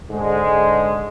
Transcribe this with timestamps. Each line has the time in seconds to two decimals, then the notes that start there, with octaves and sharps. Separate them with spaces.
0.11 G#2 D3 G#3